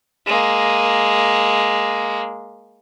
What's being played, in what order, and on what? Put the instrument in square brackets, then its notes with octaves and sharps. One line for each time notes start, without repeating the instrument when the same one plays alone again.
[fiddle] G#3 A#3